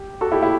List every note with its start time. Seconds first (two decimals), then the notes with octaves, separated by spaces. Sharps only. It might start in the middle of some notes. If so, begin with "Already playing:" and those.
Already playing: G4
0.21 F#4 A4
0.32 E4 G4
0.43 E4